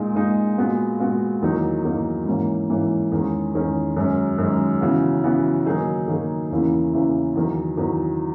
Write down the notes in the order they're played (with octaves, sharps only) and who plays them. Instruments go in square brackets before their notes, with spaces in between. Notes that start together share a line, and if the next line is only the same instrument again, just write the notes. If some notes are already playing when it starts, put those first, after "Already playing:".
Already playing: [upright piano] A#2 G#3 D#4
A#2 G#3 D#4
A#2 G#3 B3 F#4
A#2 G#3 B3 F#4
E2 D#3 F#3 A#3 D#4
E2 D#3 F#3 A#3 D#4
G#2 E3 A#3 C#4
G#2 E3 A#3 C#4
E2 D#3 G#3 C#4
E2 D#3 G#3 C#4
F#2 D#3 G#3 C#4
F#2 D#3 G#3 C#4
C#3 E3 B3 F#4
C#3 E3 B3 F#4
D#3 F#3 A#3 D#4 G#4
D#3 F#3 A#3 D#4 G#4
E2 C#3 E3 A#3 E4
E2 C#3 E3 A#3 E4
E2 D#3 F#3
E2 D#3 F#3